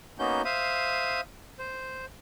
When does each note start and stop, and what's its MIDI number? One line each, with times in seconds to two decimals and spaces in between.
0.19 0.42 58
0.19 0.42 59
0.19 0.42 61
0.19 0.42 63
0.19 0.42 66
0.19 0.42 91
0.45 1.21 72
0.45 1.21 76
0.45 1.21 77
0.45 1.21 87
1.59 2.06 72